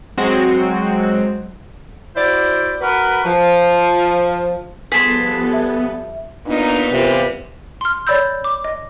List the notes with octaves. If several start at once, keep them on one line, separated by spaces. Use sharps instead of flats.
F#3 G#3 C4 F#4
E4 F#4 C5 D5
F#4 A#4 B4
F3
F3 G3 B3 G#4 A4 A5 C6 B6
E5
A#2 B3 D4 D#4
C3 E3 G3 F4 A#4
C6 F6
C#5 D5 B5 E6 G6
D6
D#5